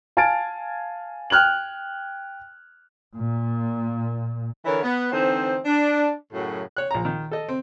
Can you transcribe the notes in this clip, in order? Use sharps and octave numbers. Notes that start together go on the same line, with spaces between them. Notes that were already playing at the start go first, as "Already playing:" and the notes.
F5 G#5 A5 F6 A6 D7
G5 F6 F#6 G#6 F#7
A#2
D3 E3 E4 A#4 C#5
B3
D3 E3 A3 C4 D#4 C5
D4
F#2 A2 C#3 F#3
C#5 F#6
A#1 A#5
D#3
A4 D#5
C4